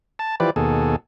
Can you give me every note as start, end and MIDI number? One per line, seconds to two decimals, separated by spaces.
0.19 0.35 81
0.40 0.50 52
0.40 0.50 53
0.40 0.50 67
0.40 0.50 71
0.40 0.50 74
0.56 0.96 39
0.56 0.96 47
0.56 0.96 68
0.56 0.96 69